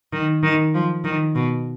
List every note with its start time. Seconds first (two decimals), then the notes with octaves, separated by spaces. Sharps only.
0.13 D#3
0.43 D#3
0.74 F3
1.04 D#3
1.35 B2